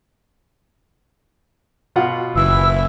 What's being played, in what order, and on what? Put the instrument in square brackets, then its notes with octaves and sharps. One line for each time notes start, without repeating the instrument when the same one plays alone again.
[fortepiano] B2 F4 F#5
[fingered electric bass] F#1 [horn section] E3 E4 [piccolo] E6